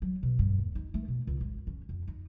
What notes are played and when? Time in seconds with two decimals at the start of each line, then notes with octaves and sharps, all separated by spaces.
0.02 F#3
0.23 B2
0.39 G2
0.58 D#2
0.75 D#4
0.94 A3
1.08 B2
1.27 C#2
1.41 G#1
1.67 C#4
1.89 F2
2.08 D#4